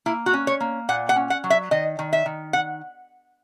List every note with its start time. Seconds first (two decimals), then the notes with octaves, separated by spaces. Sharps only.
0.06 A#3 E4
0.26 F#4
0.33 C#4
0.47 C#5
0.60 A#3
0.89 A#2 F#5
1.09 F#5
1.16 C#4
1.30 F#5
1.44 F#3
1.50 E5
1.71 D#3 D#5
1.99 D#3
2.13 E5
2.26 D#3
2.53 F#5